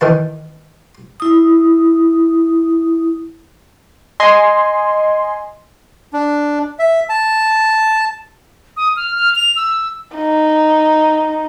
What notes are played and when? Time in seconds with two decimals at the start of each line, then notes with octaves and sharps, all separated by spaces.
0.01 D#3 E3 A5
1.20 E4 D#6
4.20 D#5 G#5 C6
6.13 D4
6.79 E5
7.09 A5
8.77 D#6
8.96 F6
9.15 F6
9.35 F7
9.56 E6
10.15 D#4